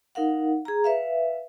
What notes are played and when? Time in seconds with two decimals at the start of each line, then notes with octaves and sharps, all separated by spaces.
0.15 D#4 A#4 F5 F#5
0.65 G#4 A#5
0.84 B4 E5 F5